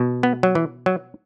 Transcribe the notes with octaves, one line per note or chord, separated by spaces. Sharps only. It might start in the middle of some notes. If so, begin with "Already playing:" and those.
Already playing: B2
B3
F#3
E3
F#3